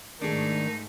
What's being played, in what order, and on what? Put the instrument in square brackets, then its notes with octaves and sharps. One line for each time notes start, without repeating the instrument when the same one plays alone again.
[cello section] G#2 A3 [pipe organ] D#3 [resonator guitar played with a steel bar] D4 G#4 [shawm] D#4